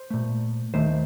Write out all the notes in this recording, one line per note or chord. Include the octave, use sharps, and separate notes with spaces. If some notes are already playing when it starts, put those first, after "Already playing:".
Already playing: C5
A#2 A3
D#2 D#3 A3 C5